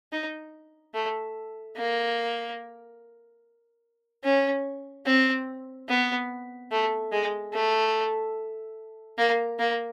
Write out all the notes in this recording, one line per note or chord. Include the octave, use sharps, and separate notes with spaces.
D#4
A3
A#3
C#4
C4
B3
A3
G#3
A3
A#3
A#3